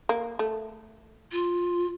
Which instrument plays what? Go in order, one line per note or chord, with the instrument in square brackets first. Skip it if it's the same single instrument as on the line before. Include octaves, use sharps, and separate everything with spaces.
[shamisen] A#3
A3
[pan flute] F4